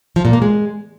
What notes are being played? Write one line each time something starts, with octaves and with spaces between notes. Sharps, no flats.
F3
A#2
A#3
G#3